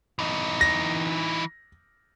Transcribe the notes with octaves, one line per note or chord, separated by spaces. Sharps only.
E3 D#4
A#6